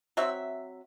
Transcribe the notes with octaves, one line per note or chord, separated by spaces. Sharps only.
F#3 C4 E5